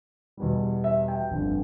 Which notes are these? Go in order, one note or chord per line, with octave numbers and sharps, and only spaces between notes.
E2 B2 G3
E5
G5
G1 F2 D3